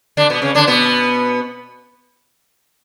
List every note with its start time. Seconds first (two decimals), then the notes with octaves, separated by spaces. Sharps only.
0.17 D3 D4
0.30 B2 B3
0.42 C#3 C#4
0.55 D3 D4
0.67 B2 B3